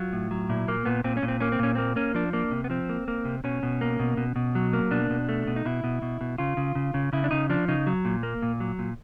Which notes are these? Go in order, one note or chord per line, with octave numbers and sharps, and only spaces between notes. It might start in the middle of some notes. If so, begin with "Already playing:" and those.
Already playing: F#3 F4
A2
F#3
A#2 E4
A#2 A#3
A#2 B3
A#2 C4
C#4
A#2
C4
A#3 C#4
C4
A#2 C#4
A#3 C4
A#3 C#4
F3 D4
A#3 D4
C3
B3
F3 C4
A#3
A#3
C3
B2 C#4
B2
A#3
B2
B2
B2
F#3
A#3
B2 D4
B2
A3
B2
D#4
B2 E4
B2
B2
B2
C#3 F4
C#3
C#3
C#3
C#3 E4
D4
C#3 D#4
F3 D4
C#3 D#4
F#3
A#2
A#3
A#2
F#3
A#2